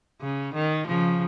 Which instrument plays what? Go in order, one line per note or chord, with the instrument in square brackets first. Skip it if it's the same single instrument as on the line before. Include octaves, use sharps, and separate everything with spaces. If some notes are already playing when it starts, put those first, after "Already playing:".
[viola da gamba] C#3
D#3
C#3 F3